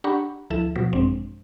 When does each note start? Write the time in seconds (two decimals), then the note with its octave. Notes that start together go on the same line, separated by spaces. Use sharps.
0.04 D4 G4 F#5 A#5 B5 C#6
0.50 D2 F3 E4 A4 E7
0.76 B2 F3 F#3
0.93 G#1 F#2 G#3 C4 D4